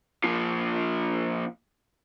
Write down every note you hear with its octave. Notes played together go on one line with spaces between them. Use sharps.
A#2 F3